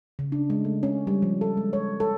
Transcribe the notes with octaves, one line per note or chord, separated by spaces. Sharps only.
C#3
D4
G#3
A3
C#4
G3
F3
A4
G#3
C#5
A4